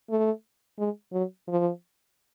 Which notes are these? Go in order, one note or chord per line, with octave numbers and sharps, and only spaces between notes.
A3
G#3
F#3
F3